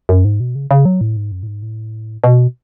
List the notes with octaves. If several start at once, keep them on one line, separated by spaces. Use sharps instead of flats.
F#2
G#2
B2
C#3
C#3
F#3
A2
G#2
F#2
A2
G#2
A2
B2